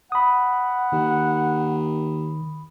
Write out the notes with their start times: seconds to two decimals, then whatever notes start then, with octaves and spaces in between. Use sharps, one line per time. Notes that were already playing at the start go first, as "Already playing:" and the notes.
0.12 F#5 B5 D#6
0.92 D#2 D#3